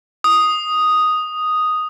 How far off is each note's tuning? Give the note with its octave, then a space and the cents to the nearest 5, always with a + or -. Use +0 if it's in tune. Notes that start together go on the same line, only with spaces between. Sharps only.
D#6 +0